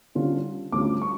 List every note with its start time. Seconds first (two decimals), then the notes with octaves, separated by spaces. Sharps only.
0.15 D3 G3 C#4 F4
0.72 D2 D3 G3 C#4 F4 D6
1.02 C#6